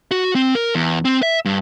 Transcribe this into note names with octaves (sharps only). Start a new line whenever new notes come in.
F#4
C4
A#4
E2
C4
E5
G2